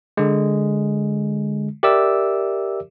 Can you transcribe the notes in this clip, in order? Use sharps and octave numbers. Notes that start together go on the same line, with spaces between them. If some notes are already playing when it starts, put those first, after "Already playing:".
D3 G#3
G4 A#4 D5 E5 D6 E6